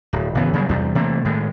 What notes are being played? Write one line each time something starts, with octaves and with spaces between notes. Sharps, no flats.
D1
G#1 C#3 E3 B3
C#3 F#3 G3 A#3
E2 C3 G3
C3 E3 A3 A#3
A2 D#3 G#3